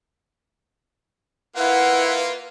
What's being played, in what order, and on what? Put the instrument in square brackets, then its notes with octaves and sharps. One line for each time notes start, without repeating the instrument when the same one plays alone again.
[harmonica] A#3 F4 [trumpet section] E4 F#5 [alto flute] B4